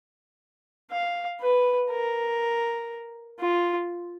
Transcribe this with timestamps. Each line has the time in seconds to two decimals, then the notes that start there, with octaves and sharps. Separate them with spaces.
0.92 F5
1.41 B4
1.91 A#4
3.40 F4